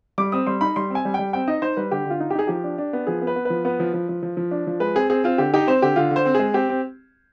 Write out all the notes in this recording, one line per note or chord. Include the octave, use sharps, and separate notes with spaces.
G3 D6
C4 D#6
G3 C6
D#4 B5
G3 C6
C4
G#5
G3
G5
G3
C4 G5
D#4 D#5
D#4 C5
G3 B4
D3 G4
D3 F4
D#4
G4
D#4 G#4
F3 G4
D4
D4
B3
F3 G#4
B3
B4
B3
F3 B4
B3 B4
F3
F3
F3
F3
F3
D4
F3
G#3 B4
C4 G#4
C4 G#4
C4 F4
D3 G4
D#4 G4
C4 C5
D3 G4
D3 F4
D3
C5
C4
G#3 G#4
C4 G4
C4